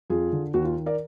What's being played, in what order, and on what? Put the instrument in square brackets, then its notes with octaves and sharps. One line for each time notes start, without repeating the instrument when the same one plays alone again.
[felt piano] F2 F4 G#4
D3
D#2 F#4
F4
D#3
A#4 D5